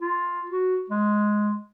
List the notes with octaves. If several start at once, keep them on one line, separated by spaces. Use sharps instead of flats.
F4
F#4
G#3